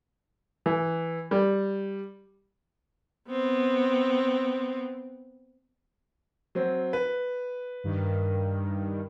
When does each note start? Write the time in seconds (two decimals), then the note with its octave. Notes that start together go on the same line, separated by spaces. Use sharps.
0.66 E3
1.31 G3
3.28 B3 C4
6.55 F#3 C4
6.93 B4
7.84 G2 D#3